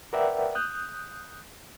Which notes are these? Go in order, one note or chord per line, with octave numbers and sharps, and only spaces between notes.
A#4 B4 D5 E5 F#5 G5
D#6 F#6 G6